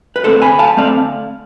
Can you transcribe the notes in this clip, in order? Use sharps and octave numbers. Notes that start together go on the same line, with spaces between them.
B4
D3 A3 C4 A4 C5
G#5 B5
F5 A5
D3 A3 C4 D5 F5